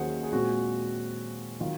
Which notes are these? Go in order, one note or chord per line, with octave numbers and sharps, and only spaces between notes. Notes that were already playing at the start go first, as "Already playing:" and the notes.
Already playing: D#2 D#3 F#3 C#4 G#4 C5 F#5
G#4
A#2 G#3 C4 F#4
D#3 F#3 F4